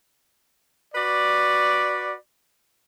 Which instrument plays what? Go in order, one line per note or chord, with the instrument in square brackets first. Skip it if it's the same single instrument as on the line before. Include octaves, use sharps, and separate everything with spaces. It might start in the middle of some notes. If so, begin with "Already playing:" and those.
[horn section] F#4 B4 D5